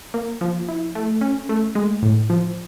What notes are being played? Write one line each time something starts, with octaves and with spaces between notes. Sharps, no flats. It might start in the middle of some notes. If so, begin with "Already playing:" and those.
A#3
F3
E4
A3
C#4
A3
G#3
A2
F3